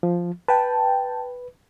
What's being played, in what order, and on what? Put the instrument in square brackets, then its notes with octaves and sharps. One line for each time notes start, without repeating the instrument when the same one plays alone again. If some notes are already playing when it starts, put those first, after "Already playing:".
[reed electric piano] F3
[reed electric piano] B4 [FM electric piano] G5 A5